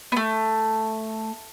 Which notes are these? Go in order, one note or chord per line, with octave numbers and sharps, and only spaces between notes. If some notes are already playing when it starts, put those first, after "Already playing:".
A3 B3